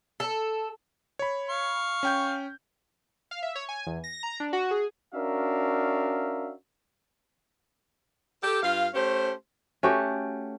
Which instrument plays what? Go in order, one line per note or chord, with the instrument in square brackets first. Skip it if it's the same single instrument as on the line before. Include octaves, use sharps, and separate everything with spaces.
[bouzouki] A4
[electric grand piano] C#5 B5
[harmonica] F5 C#6
[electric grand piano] C#4 G5 G6
[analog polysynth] F5
E5
C#5
G#5
E2
A#6
A#5
D4
F#4
G#4
[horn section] C#4 D4 F#4 A#4 E5 F5
[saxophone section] G4 A4
G2 F4 F5
A3 C#4 G4 C5
[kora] A3 C#4 F#4 G4